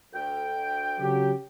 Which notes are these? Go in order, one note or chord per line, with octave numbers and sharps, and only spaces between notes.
D2 G5
C#3 F#3 G4